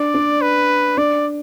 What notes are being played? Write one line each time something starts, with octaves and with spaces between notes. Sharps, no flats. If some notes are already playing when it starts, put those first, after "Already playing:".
Already playing: D4 D5
D4
B4
D4 D5